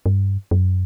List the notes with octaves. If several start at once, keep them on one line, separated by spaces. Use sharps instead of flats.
G2
F#2